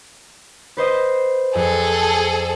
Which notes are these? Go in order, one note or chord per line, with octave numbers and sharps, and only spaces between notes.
B4 C5 D#5
F2 G#4 A4